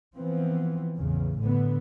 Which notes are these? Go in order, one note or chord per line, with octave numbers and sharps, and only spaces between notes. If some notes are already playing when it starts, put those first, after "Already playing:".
E3 F3 B3 C4
A1 E2 C#3
A2 D3 B3